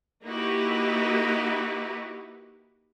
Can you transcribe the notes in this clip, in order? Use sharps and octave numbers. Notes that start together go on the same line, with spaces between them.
A#3 D#4 E4 F#4 G4 B4